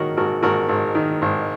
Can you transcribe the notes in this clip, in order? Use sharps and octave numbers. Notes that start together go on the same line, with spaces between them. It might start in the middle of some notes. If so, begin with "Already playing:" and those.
Already playing: G#1 D#3 F#4 A#4 C#5
G#1 F#4 A#4
G#1 F#4 A#4
G#1
D#3
G#1